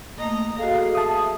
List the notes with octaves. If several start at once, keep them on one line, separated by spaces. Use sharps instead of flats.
A3 A#3 D#5 A#5
F#4 G#4 A4 D#5 F5
E5 A5 D#6